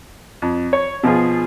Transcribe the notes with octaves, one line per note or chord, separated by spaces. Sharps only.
F2
C#5
B2 F3 F4 G#4